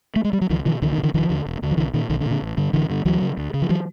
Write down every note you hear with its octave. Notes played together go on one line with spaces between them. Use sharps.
A3
G#3
G3
F#3
C#2 D#3 F3
B2 D#3 F3
C#2 D3 E3
D#3
B2
D3 E3
E1 D#3 F3
D#2 D3
E1
D#2 D3
F3
B1 D3 E3
A#2 D#3
B1 D#3
D3
A#2
D3
A1
G2 D3
A1 D3 E3
G2 D3
D2 E3 F#3
C#3
D2
C#3
F3
E3 F#3